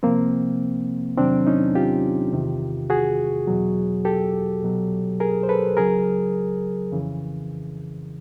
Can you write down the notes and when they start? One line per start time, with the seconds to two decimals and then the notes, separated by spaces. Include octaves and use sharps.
0.03 C2 C3 F3 A#3 C4
1.18 E2 C3 D#3 F#3 C4 D4
1.47 C#4 D#4
1.75 F4 G4
2.33 E2 C3 D#3
2.90 F#4 G#4
3.47 E2 B2 F#3
4.05 G4 A4
4.62 C2 B2 F#3
5.20 G#4 A#4
5.43 C5
5.49 A4 B4
5.77 C#2 C#3 F#3 G#4 A#4
6.92 F2 C#3 E3